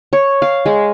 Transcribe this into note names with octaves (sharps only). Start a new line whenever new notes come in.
C#5
F5
G#3